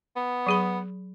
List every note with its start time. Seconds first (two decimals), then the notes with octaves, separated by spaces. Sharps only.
0.16 B3
0.46 F#3 G#4 B5